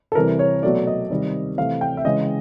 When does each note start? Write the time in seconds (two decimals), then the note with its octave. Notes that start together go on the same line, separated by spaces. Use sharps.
0.12 A4
0.15 C3 E3 G3 A#4
0.39 C#5
0.63 B2 F#3 A3 D5
0.87 D#5
1.10 C3 D#3 G3
1.58 C3 E3 A3 F5
1.81 G5
1.97 E5
2.05 C#3 E3 G#3 D#5